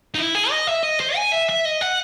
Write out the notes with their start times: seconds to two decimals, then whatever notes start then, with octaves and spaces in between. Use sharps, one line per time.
0.14 D#4
0.18 E4
0.35 G#4
0.50 D#5
0.68 E5
0.83 D#5
1.00 C5
1.16 G#5
1.32 E5
1.49 E5
1.65 D#5
1.81 F#5